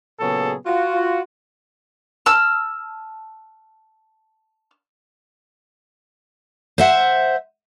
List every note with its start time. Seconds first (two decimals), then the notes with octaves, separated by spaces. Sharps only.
0.20 A#2 C#3 F#3 B3 G#4 A4
0.66 F4 F#4
2.26 A5 E6 F6
6.78 C5 E5 F#5